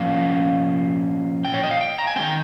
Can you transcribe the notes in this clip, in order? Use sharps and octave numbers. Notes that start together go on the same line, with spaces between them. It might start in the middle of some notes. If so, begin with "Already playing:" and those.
Already playing: A#2 F3 A#3 C#4 F5
G5
C#5
D#5
F5
G5
A#5
G#5
D#3 G#3 C4 G5